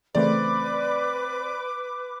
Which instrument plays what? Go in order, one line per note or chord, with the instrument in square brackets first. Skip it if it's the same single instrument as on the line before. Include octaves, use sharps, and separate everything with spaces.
[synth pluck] C#3 E3 A3 [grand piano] C4 D5 [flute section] B4 D6